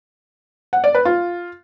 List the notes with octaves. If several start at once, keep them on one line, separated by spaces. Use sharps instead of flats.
F#5
D5
B4
F4